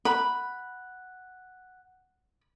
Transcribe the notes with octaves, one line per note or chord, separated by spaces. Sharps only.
F#5 B5 F#6